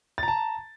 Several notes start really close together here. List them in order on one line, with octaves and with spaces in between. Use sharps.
A6 A#5 A5